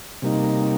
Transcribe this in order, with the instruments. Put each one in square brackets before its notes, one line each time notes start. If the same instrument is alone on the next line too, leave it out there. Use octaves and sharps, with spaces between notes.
[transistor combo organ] C3 G3 A#3 D#4